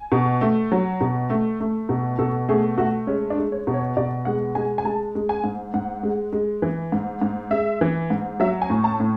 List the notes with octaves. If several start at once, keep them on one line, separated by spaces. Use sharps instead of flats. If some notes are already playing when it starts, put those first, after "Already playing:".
Already playing: G#5
B2
A3
F#3
B2
A3
A3
B2
B2 A4
A3 G#4
A3 F#4
G#3 C#4
D4
G#3
C#5
B2
C#5
B2 D5
G#3 F#5
G#3 G#5
G#5
G#3 A5
G#3
G#5
G#2
G#2 F#5
G#3
G#3
E3
G#2
G#2
G#3 E5
E3
G#2
F#3 E5
G#5
A2
A5
A2